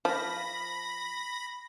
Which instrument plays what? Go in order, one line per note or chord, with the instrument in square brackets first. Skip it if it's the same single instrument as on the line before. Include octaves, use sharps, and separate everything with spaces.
[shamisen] F3 [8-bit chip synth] B5 A#6